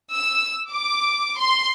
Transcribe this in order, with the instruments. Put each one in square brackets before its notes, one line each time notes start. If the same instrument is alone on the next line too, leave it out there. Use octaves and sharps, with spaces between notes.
[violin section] E6
D6
C6